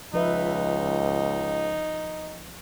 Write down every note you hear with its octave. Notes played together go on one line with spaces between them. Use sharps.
C#2 F3 D#4 B4 E5